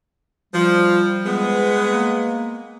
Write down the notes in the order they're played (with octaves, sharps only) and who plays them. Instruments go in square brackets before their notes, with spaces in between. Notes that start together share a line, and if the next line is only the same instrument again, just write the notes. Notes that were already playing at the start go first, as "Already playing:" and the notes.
[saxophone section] F3 [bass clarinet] G3
[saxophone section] G#3 B3
[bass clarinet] A#3